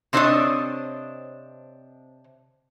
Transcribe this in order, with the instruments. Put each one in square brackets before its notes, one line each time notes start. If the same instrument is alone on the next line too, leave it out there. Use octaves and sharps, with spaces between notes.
[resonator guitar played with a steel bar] C3 C4 D4 C5 C#5 D#5